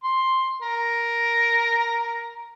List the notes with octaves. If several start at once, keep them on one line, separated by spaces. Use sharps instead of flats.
C6
A#4